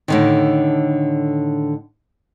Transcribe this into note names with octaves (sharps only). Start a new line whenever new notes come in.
A2 D3 D#3